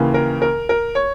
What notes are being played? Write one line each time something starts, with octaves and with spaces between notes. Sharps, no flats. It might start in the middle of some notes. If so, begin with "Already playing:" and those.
Already playing: D#2 C#3 E3 A#3
A#4
A#4
A#4
C#5